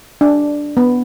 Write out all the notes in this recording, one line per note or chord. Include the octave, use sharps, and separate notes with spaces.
D4
B3